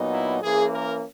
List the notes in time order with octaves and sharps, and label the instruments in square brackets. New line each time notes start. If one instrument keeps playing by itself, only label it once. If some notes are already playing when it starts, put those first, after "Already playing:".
Already playing: [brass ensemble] A#2 F#3 B3 D#4
E4
E3 A#3 C#4 G#4
A#4